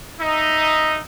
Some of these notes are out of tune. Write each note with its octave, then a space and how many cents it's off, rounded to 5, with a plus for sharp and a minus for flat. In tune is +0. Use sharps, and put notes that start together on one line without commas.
D#4 +0 E5 +0